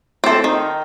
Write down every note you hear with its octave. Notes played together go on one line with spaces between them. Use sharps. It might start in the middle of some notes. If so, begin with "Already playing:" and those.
C4 A4
D#3